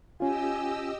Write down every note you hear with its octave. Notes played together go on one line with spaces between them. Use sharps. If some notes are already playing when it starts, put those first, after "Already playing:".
C#4 F4 G4 D#5 G#5 E6